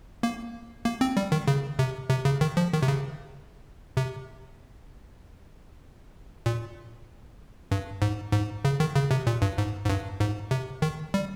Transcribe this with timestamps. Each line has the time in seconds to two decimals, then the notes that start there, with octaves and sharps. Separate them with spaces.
0.23 A#3
0.85 A#3
1.01 C4
1.17 G3
1.32 D#3
1.48 C#3
1.79 C3
2.10 C3
2.25 C#3
2.41 D#3
2.57 F3
2.73 D#3
2.82 C3
2.88 C#3
3.97 C3
6.46 A#2
7.71 G2
8.02 G#2
8.33 G#2
8.65 C#3
8.80 D#3
8.96 C#3
9.11 C3
9.27 A#2
9.42 G2
9.58 G#2
9.85 G#2
9.89 G2
10.20 G#2
10.51 C3
10.82 D#3
11.14 G3